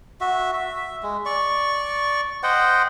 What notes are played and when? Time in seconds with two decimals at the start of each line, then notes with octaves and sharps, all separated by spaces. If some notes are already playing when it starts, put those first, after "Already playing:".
0.21 F#4 E5
0.53 E5
1.03 G#3
1.25 D5 C#6
2.43 C5 D#5 F#5 G5